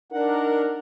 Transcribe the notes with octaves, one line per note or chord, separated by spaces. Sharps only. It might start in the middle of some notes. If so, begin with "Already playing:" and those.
D4 D#4 A#4 F#5